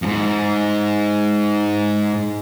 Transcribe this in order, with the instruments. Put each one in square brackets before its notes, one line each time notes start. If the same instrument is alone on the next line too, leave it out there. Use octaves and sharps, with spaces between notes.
[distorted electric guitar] F2 G#2